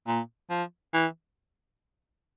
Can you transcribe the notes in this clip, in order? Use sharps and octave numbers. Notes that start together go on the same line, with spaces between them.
A#2
F3
E3